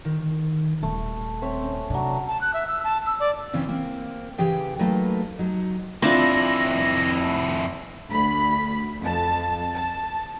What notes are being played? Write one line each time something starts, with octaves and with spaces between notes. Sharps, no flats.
D#3
D#1 A3
C4 C#5 E5
C#4
C3 F#3 D4
A5
F#6
E5
E6
A5
E6
D5
C#3 E3 C4 C#4
A#3 C4
C#3 E3 G4 G#4 G5
F#3 A3 A#3 D#4 B4
F#3 D#4
F2 C4 D4 E4 F4 A#6
D2 B5
F2 A5
A5